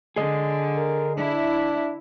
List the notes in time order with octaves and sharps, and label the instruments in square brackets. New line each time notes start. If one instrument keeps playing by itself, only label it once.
[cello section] D3 [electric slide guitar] G#4 D#5
[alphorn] A#4
[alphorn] D4 [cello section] E4